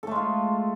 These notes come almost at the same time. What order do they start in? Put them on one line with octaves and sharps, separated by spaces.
A4 A3 G#3 F4